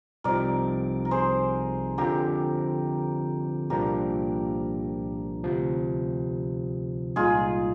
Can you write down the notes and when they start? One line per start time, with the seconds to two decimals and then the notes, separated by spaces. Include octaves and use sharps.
0.24 C2 C3 F3 C4 D#4 A#4 D5
1.05 A#4
1.11 G#4 C5
1.98 D3 F3 C4 F4 G4 A#4
3.70 C2 A#2 F3 A#3 D4 G4 A#4
5.44 D2 C3 F3
7.16 C2 A#2 G#3 D#4 F4 G#4